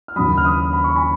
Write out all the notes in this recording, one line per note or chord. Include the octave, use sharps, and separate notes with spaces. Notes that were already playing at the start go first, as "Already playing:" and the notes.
F6
D#2 C#3 F#3 B5 D#6
F6
B5 D#6
B5
C#6
G#5 B5